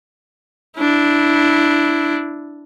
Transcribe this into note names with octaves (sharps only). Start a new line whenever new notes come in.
D4 E4